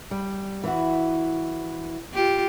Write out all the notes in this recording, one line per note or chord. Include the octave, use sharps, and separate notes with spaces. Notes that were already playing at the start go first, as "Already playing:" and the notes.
G3
E3 E4 F#4
F4 G4